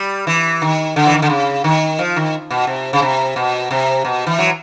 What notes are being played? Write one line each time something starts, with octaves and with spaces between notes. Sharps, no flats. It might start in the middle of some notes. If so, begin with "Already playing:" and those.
Already playing: G3
E3
D#3
D3
E3
D#3
D3
C#3
D#3
F3
D#3
B2
C3
C#3
C3
B2
C3
B2
E3
F#3